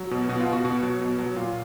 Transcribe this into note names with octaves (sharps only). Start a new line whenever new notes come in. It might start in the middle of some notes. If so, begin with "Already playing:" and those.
Already playing: F#3
B2
B2 F#4
F4
B2
F#4
B2 F#4
F#3
B2
F#3
A#2 F4